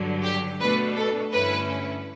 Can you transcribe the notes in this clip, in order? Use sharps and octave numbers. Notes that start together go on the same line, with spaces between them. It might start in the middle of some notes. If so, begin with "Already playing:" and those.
Already playing: G2 D3 F#3
G4
B2 A3 D4 B4
A4
G2 D3 A3 C#4 E4 B4